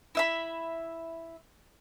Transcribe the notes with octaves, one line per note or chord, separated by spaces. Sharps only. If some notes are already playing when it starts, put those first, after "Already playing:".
E4 E5 B5